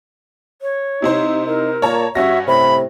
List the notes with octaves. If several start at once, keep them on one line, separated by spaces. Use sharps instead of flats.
C#5
C3 D#4 E4 C5
D#4 A#4
A#2 C#5 A5 A#5
G2 C#4 F#4 E5 A#6
A2 C3 B5